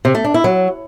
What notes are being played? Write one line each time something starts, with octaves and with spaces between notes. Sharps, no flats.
C3
A3
D4
E4
F#3